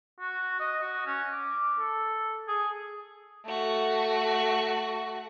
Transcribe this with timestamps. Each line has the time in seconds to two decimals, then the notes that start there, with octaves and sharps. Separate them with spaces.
0.20 F#4
0.60 D#5
0.81 F#4
1.06 C#4
1.32 D6
1.79 A4
2.48 G#4
3.45 A3 F#4